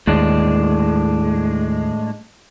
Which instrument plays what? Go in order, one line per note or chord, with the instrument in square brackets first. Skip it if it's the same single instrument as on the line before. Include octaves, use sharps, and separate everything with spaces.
[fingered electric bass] D#2 [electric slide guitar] A2 G#3 D4